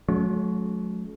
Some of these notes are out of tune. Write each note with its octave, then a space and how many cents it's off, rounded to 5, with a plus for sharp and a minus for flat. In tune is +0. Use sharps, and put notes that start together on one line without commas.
F#3 -20 A3 -40 C#4 +20